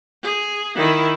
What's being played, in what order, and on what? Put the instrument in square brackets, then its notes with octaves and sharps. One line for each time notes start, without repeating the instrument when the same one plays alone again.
[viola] G#4
D#3 E4